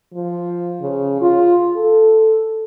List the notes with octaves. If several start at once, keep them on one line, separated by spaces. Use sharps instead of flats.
F3
C#3
F4
A4